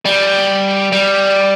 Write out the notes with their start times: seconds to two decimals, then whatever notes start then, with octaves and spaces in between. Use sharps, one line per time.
0.05 G3
0.92 G3